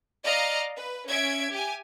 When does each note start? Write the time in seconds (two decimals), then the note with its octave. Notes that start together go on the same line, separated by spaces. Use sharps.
0.24 D5 D#5 F5 A#5 F6
0.76 B4
1.08 C#4 E5 G#6 D7
1.51 G4 G#5